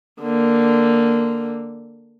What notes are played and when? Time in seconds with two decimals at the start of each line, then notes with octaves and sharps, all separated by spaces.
0.21 D3 A#3